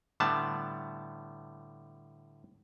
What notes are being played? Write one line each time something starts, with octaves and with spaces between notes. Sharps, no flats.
A2 D3 G3 B3 A5